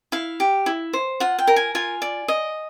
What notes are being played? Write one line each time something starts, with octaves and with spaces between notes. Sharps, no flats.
E4 F5
G4
E4
C5
F4 F#5
G5
A#4
G#5
F4 G#5
D5
D#5